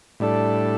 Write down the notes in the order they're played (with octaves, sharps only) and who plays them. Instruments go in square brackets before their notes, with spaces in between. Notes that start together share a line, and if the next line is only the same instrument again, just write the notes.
[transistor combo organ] A2 G3 D4 A4